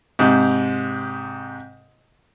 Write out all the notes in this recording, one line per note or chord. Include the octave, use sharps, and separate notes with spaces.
G#2 C3